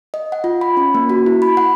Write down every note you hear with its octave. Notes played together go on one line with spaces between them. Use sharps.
D#5
F#5
F4
B5
C#4
A#3
F#4
E4
B5
F#5